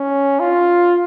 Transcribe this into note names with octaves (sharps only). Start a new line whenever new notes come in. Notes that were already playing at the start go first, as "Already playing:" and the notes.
Already playing: C#4
F4